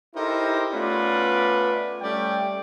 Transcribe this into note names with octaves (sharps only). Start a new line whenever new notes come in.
D#4 E4 G4 A4 A#4 C5
A3 B3 C#4 F4 B4 D5
G3 A3 C#4 D5 G5